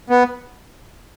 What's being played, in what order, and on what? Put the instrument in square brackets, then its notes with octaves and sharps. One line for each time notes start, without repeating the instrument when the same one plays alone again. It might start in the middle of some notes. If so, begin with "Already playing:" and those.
[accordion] B3